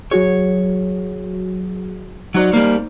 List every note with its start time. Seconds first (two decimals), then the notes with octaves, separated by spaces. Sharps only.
0.11 F#3 F#4 G#4 C#5
2.34 F#3 D#4 F#4 C5 D5
2.53 G3 A#3